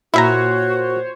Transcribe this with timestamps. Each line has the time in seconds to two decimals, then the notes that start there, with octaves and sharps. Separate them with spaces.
0.14 A#2 E4 F#4 C5 C#5 E5 A#5